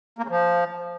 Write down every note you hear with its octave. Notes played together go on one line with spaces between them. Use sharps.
A#3
C#3
F3